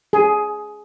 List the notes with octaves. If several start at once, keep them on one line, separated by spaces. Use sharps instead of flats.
G#4